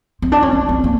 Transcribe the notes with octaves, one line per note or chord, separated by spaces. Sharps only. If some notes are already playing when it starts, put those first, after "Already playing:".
C4
D4
C#4
C#4
C4
A#3